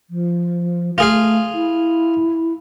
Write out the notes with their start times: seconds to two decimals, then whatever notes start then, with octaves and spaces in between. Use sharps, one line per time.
0.10 F3
0.98 A3 F4 G#4 F5
1.54 E4